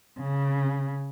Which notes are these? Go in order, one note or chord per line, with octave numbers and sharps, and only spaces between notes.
C#3